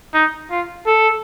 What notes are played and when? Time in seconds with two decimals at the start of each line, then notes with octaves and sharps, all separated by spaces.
0.14 D#4
0.51 F4
0.87 A4